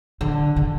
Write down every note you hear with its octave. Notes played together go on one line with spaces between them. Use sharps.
D3
D3